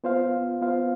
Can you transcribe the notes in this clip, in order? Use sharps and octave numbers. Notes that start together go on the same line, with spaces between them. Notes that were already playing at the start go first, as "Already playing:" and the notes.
B3 F4 C5 F5
B3 F4 C5 F5